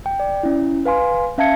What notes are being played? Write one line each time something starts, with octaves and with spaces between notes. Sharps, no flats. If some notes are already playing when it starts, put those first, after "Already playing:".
G5
D5
C#4 E4
B4 F5 G#5 C6
C#4 E5 F5 A5 G#6 C#7